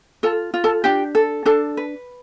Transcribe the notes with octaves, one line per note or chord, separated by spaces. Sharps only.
F4 A4 A5
F4
A4 A5
D4 G4 G5
A4
D4 A4 A5
B4